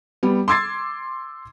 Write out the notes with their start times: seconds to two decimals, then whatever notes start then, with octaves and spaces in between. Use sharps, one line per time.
0.23 G3 B3
0.48 C6 D6 E6 G#6 A6 C7